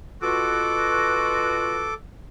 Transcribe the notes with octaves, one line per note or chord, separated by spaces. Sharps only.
B2 F4 F#4 A4 D6